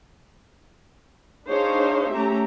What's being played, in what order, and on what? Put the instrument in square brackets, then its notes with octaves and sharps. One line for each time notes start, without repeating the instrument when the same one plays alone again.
[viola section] D4 D#4 G#4 C5 C#5 F5
A3 C#4 G4 E5 A#5